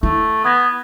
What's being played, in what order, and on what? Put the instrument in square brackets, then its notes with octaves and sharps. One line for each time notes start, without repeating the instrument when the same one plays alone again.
[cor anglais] A3 [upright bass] E4
[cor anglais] B3 [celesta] D#6 G#6 A#6